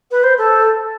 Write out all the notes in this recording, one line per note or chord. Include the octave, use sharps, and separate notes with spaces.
B4
C5
A4